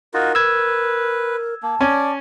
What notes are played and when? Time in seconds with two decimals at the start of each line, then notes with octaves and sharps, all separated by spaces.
0.14 D#4 F4 F#4 A#4
0.35 B4 E6 G#6
1.63 A#3 A5
1.81 C#4 D5